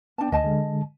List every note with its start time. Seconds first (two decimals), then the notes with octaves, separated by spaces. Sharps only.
0.18 B3 D4 G5 A5
0.32 D2 D#5 G#5 A5
0.44 D3 G#3